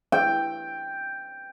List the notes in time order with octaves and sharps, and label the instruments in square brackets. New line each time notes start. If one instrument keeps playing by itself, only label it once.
[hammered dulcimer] G5